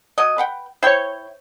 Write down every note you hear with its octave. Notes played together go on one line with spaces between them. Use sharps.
F#3 D#5
B4 F#5 G5
E4 C5 C#5 G5 C#6